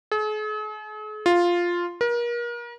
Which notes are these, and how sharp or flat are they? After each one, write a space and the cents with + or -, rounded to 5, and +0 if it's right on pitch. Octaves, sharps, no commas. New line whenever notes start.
G#4 +45
F4 +0
A#4 +35